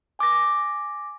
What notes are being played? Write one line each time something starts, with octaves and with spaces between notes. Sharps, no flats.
G#5 D6 A6 A#6